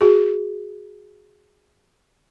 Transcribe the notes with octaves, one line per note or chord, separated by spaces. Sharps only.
F#4 G#4